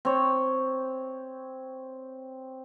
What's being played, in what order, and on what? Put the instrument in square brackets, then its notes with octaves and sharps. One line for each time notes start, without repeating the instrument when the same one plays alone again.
[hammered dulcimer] C4 C#5